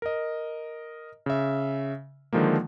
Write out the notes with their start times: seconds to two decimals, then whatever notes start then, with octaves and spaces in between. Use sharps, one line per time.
0.02 A#4 D#5
1.26 C#3 E5
2.33 D3 D#3 F3 G#3 A#3